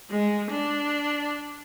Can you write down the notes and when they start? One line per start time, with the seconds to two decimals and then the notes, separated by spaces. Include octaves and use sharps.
0.11 G#3
0.51 D4